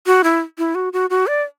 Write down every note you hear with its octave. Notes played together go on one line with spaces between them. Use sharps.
F#4
E4
E4
F#4
F#4
F#4
D5